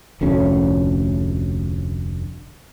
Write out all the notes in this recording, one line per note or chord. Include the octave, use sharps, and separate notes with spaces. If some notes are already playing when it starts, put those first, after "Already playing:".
F1 D2 A2 C#4